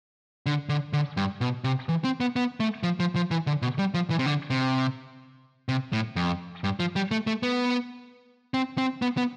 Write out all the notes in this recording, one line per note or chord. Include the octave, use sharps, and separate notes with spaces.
D3
D3
D3
G2
B2
C3
E3
C4
B3
B3
A3
F3
F3
F3
E3
D3
B2
G3
F3
E3
C3
D3
C3
C3
A2
F2
G2
F3
G3
A3
A3
B3
C4
C4
B3
B3